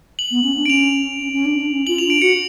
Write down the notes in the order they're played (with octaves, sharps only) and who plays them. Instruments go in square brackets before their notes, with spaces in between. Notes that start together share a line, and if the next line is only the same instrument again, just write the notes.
[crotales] F#7
[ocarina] B3
C#4
D4
[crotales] D7
[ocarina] C#4 [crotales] F7
[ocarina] C#4
C#4
D4
D4
C#4
[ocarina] F4 [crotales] F#7
[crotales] F7
[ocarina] D4 [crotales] D7
[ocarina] F#4 [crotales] C#7